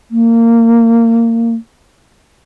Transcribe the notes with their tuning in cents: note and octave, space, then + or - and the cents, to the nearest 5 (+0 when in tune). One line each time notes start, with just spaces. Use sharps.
A#3 -20